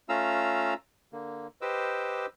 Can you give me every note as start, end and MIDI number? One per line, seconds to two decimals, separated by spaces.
0.09 0.74 57
0.09 0.74 61
0.09 0.74 65
0.09 0.74 77
0.09 0.74 82
0.09 0.74 88
1.13 1.47 50
1.13 1.47 58
1.61 2.26 67
1.61 2.26 71
1.61 2.26 72
1.61 2.26 75
1.61 2.26 86
1.61 2.26 88